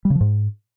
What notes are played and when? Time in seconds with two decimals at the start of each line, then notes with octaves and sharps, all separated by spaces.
0.05 G3
0.10 C#3
0.15 F3
0.21 G#2